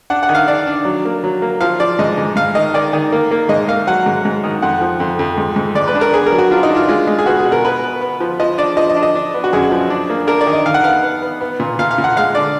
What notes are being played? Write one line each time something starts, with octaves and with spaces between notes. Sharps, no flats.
D4 F#5
F#5
D#3
F5
D4 D5
D4
F#3
A#3
F#3
A#3
F3 F5
F3 D5
G#2 D#5
G#2
G#2 F5
D#3 D#5
D#3 D5
D#3
A#3
A#3
G#2 D#5
A#3 F5
F#3 F#5
G#2
G#2
D#3
F2 F#5
F3
F2
F2
G#2
G#2
G#2 D5
B4
D4
A#4
B3 G#4
A#4
F#3
F#4
D4 F4
D#4
D4
F4
G#3 F4
G#3
G#4
B3 F#4
G#4
B2
A#4
B3 B4
B3
B3
F3
F3 D#5
D4 D5
F3 D#5
D#5
D4
D#5
D4
B3
F#4
F#2 G#4
F3
D4
A#3
D4 A#4
D5
D#3
D#5
D#3 F5
F#5
B3 F5
B3
B3
B3
A#2
A#2 F5
F5
A#2
F#5
G#3 F5
D3 D5